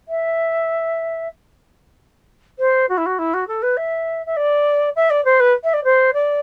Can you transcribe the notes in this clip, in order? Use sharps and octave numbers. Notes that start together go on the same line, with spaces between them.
E5
C5
F#4
E4
F#4
E4
F#4
A4
B4
E5
E5
D5
E5
D5
C5
B4
E5
D5
C5
D5